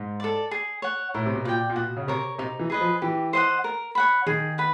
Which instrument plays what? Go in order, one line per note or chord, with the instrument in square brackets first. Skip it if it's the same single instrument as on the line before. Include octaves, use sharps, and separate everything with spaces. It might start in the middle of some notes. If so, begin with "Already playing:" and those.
Already playing: [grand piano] G#2
[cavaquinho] A4 D5
G#4
C#5 F#5
[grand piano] A2 [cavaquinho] A#4
[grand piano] C3
B2
[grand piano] A#2 [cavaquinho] D5 G5
[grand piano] A#2
[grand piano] B2 [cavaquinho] F#4
[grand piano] C#3
[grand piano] C3 [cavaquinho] A#4 C#5
[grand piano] C3 [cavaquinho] D#4
[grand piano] E3
[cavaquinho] G#4 B4 D#5
[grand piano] F3
[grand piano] E3 [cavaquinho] G4
[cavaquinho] C5 D#5 F#5
A#4
C#5 F#5 B5
[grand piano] D#3 [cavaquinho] G#4
[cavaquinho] B4 F#5